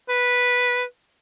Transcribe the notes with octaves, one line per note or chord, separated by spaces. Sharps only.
B4